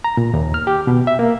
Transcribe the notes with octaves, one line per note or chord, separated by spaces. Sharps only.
A#5
A#2
D#2
F6
G4
B2
E5
A#3